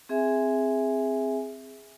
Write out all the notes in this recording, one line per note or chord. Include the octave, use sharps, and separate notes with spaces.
C4 G#4 E5 G#5